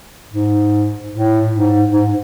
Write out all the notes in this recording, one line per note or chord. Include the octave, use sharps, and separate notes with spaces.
G#2
A2
G#2
G#2